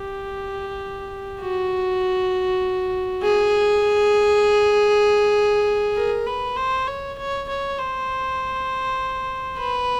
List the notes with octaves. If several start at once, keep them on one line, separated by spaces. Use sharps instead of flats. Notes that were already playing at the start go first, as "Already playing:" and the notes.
Already playing: G4
F#4
G#4
A#4
B4
C5
C#5
C#5
C#5
C5
B4